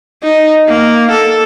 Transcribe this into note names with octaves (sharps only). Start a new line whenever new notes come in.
D#4
A#3
A4